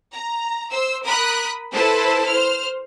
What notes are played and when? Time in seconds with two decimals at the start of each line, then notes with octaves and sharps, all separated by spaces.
0.15 A#5
0.71 C5 E6
1.04 A#4 B5 D#6 F#6
1.74 E4 A4 B4 C5 A5
2.29 C5 F6